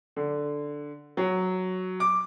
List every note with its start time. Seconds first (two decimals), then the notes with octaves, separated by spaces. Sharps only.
0.16 D3
1.17 F#3
2.00 D6